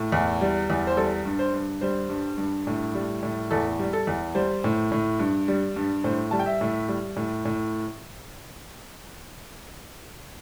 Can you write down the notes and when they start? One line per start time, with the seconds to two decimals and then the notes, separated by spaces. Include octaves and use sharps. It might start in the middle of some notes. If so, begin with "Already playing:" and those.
Already playing: A2
0.12 E2
0.41 G3
0.70 E2
0.87 C5
0.97 G3 A4
1.25 G2
1.39 C5
1.54 G2
1.81 G3 C5
2.09 G2
2.38 G2
2.67 A2
2.94 G3
3.23 A2
3.51 E2 A4
3.79 G3
3.93 A4
4.07 E2
4.35 G3 C5
4.64 A2
4.92 A2
5.19 G2
5.48 G3
5.76 G2
6.04 A2 C5
6.31 G3 A5
6.39 G5
6.46 E5
6.61 A2
6.88 G3
7.16 A2
7.45 A2